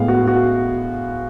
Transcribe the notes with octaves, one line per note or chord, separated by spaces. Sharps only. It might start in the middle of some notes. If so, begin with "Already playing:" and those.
Already playing: A2 G#3 B3 F5
F#4
F#4